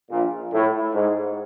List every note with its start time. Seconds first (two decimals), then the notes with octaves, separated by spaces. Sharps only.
0.10 A#1 A#2
0.52 A2
0.94 G#2